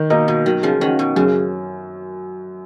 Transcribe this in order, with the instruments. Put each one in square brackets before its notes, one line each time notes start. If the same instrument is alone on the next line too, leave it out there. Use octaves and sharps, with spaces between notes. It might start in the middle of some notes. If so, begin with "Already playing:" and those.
Already playing: [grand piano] D#3
[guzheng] B2 [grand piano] A#3 D#4 A#4
[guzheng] B2
[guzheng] D#3 [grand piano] F#3
[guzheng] C#3 F3
[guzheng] D#3 [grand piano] C#4 F#4
[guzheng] B2
[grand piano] F#2 [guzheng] C#3